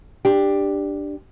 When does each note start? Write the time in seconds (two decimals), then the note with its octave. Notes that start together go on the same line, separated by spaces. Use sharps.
0.25 D4 G4